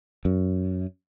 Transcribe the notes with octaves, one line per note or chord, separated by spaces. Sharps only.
F#2